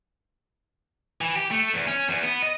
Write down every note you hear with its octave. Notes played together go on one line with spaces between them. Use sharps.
E3
G4
A3
E2
C#4
E2
B3
D#5